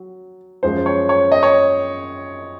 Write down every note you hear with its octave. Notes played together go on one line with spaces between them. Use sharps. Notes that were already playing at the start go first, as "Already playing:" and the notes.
Already playing: F#3
F#2 F3 G#3 C5
C#5
C#5
D#5
C#5